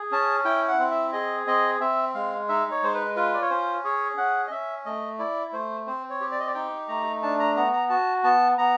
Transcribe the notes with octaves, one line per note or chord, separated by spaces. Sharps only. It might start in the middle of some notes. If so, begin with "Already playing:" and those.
Already playing: G#4
C#4 A5
E4 G5
F#5
C4
E5
G#4 D#5
C4 D#5
C4 E5
G#3 F5
D#4 E5
C#5
G#3 C5
B4
F4 B4
D5
C#5
C#4 C5
G#4 C#5
C#4 F#5
D#5
C#4 E5
A3 D#5
E4 D5
A3 C5
C4 C5
C#5
G4
D5
D#5
D5
D#4 G5
A3 A#5
D4 A5
A#5
B3 A#5
A#5
F#4 A5
B3 A5
B3 A#5